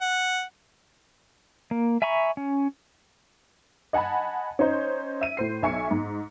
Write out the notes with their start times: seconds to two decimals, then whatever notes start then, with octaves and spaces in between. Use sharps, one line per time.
0.01 F#5
1.71 A#3
2.02 E5 G#5 A#5 B5 C#6
2.37 C#4
3.93 D#5 F#5 G#5 A5 B5
4.59 C#4 D#4 C5
5.21 E5 D#7
5.37 A2 C5 C7
5.62 B1 E5 G#5 C#6 C#7
5.91 G#2